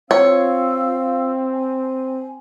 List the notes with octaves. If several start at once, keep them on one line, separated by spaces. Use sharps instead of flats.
C4 F4 C#5 F5 E6
G#5